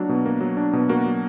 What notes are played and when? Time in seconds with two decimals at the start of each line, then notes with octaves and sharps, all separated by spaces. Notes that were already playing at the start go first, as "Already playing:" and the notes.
Already playing: F#3 A#3 D4
0.09 B2
0.25 A#3
0.41 F#3
0.57 D4
0.73 B2
0.89 A#3 F#4
1.06 F#3